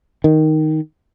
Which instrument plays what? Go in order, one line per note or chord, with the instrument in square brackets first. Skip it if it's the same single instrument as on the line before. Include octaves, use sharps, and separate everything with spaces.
[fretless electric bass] D#3